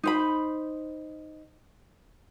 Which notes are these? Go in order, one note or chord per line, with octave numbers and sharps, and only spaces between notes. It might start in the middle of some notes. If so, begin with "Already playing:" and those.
D#4 C5 B5